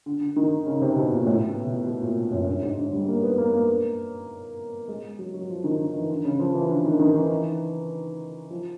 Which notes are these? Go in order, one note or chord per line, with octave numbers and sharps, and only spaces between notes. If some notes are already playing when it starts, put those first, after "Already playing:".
D3
D3
D#3
C#3
C3
B2
A#2
A2
B2
B2
B2
A#2
F#2
G2
G#2
D3
G3
A#3
B3
A#3
A#3
G#3
F#3
F#3
F3
D#3
D3
E3
D3
C#3
F3
E3
D3
D#3
D#3
E3
F3